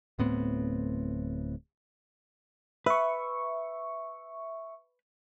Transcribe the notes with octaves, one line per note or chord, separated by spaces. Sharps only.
D1 A2 B3 C4
B4 E5 C#6